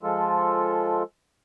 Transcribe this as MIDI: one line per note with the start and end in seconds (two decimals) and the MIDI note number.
0.03 1.03 53
0.03 1.03 56
0.03 1.03 65
0.03 1.03 69